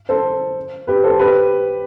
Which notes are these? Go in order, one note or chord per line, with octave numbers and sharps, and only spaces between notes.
A4 C5
G4 B4
A4 C5
G4 B4